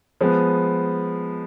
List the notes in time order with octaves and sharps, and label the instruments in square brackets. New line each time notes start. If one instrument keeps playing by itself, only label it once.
[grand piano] F3 G#3 B3